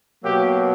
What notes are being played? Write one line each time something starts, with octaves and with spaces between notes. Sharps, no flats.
B2 F#3 A#3 G4